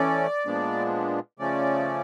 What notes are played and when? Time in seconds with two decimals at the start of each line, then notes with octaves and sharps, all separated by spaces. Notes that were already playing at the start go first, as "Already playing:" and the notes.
Already playing: E3 A3 C#4 D5
0.45 A#2 F3 G#3 B3 D4
1.39 C#3 F3 A3 C#4 D5